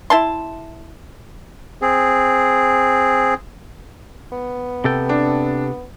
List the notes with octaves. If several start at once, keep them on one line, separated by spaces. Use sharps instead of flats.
E4 A5 C6
C4 G#4
B3
C3 A4 G5
D4